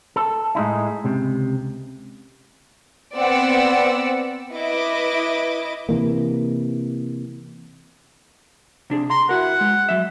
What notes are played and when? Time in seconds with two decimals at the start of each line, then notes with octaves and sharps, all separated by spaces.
0.16 A4
0.55 A2 G#3 D#4 E4
1.04 C#2 C3
3.16 B3 C4 D5 F#5 E6
4.53 E4 B4 D#5 D6
5.89 C3 E3 A#3
8.90 C3 D4 G#4
9.10 A#5 C6
9.29 E4 F#4 A#4 F#5
9.61 G#3
9.89 F#3 E5